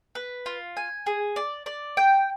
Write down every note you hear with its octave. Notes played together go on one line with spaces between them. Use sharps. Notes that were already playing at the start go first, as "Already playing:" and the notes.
B4
F4
G#5
G#4
D5
D5
G5